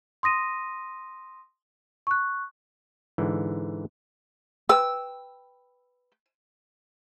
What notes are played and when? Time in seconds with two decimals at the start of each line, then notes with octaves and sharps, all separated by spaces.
0.23 C6 D#6 A#6 D#7
2.07 C#6 F#6
3.18 G#2 D3 E3
4.69 B4 G5 E6